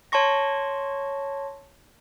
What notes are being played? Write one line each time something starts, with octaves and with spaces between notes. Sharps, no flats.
C#5 A5 C6 C#6 A#6